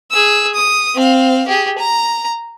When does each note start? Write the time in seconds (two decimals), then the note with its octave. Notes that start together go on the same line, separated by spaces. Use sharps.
0.11 G#4 E6
0.54 D#6
0.95 C4 F5
1.47 G4 G#4
1.78 A#5